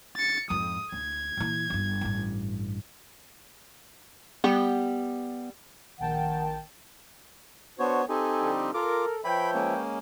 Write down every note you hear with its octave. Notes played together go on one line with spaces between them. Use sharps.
A6 C#7
F2 G#2 D#6
D2 G#6
A#2 E3
G1 G2
A1 G2
G3 B3 G4
A#1 D#3 F#5 G5 A5
B3 D4 F#4 C5 C#5
C4 D#4 G4 A4 G#5
D3 F3 G3
F4 A4 A#4 D6
F3 B4 C#5 E5 G5 B5
G#3 A#3 C#4